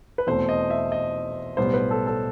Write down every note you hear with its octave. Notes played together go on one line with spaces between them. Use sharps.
B4
E2 B2 A3 C4 C5
D#5
E5
D#5
B1 A2 G3 B3 C5
B4
A4
A4